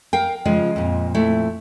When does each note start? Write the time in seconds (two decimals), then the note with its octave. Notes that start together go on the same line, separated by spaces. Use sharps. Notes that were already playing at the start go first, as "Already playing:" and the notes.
0.13 A#4 F5 G5
0.45 C#3 F3 G#3 F4
0.76 F2 A#2
1.14 A3 E4